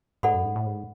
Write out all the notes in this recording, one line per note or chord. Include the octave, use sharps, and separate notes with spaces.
G#2 A4 D5 F#5 B5
F#2
G#2
A2
G#2